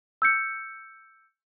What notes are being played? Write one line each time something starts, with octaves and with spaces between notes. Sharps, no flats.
E6 G6 C#7